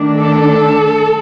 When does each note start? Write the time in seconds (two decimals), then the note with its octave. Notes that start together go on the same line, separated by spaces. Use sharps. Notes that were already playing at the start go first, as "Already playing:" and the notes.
Already playing: D#3 A3 D4
0.17 A4